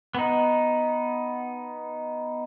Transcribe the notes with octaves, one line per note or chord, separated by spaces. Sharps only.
B3 D#4